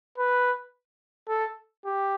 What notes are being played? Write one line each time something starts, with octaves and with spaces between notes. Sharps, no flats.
B4
A4
G4